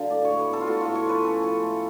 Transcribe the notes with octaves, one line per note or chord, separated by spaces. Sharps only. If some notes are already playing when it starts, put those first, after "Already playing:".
Already playing: D3 F#3 F5
A2 D5
C#5
A2
B4
B3 A4
F4
A2 F#4
A2 F4
C#5
F3 B4
C#4 A4
F3
A3